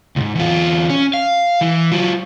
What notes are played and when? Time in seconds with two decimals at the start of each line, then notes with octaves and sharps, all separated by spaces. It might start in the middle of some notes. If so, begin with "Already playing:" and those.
0.16 C#2 G#2
0.35 E2 F4
0.90 C#4
1.14 F5
1.61 E3
1.92 F#3 F4